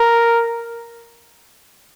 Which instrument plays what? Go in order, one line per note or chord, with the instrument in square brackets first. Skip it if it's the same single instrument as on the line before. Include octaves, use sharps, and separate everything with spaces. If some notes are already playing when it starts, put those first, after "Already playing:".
Already playing: [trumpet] A#4